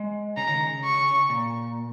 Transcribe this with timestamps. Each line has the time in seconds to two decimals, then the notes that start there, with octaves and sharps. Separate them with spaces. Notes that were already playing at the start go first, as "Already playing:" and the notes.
Already playing: G#3
0.37 C#3 A#5
0.49 D#3
0.61 C#3
0.84 C#6
1.29 A#2